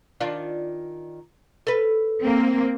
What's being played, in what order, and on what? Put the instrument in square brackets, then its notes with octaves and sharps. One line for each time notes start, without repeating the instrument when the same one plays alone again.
[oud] D#3 D4 F4
A4 B4
[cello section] A#3 C4